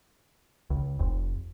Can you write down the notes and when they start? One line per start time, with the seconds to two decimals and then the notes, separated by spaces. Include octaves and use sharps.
0.70 C#2
0.99 F1